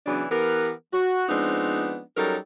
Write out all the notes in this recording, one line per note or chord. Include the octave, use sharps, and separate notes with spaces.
C#3 E3 F#3 B3 D4
E3 B3 G4 A#4
F#4
F3 G#3 B3 C4 D4 D#4
F#3 G3 C#4 D#4 A4 A#4